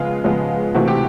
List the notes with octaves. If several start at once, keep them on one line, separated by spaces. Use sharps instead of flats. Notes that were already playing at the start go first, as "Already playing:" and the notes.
Already playing: C#3 F3 G#3 B3 F4
C#3 F3 G#3 B3
C3 E3 A3 C4 F#4
G4